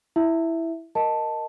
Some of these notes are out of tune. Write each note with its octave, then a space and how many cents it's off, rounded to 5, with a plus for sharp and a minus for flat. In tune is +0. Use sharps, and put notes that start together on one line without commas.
E4 +0 E5 +0
A#4 +0 D#5 +0 A5 +0